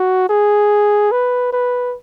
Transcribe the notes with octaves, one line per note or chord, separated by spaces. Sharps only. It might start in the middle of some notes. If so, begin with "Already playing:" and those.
Already playing: F#4
G#4
B4
B4